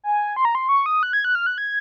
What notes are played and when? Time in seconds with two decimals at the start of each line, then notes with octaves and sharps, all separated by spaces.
0.04 G#5
0.36 C6
0.45 A#5
0.55 C6
0.69 C#6
0.86 D#6
1.03 F#6
1.13 G#6
1.25 F#6
1.35 F6
1.46 F#6
1.58 G#6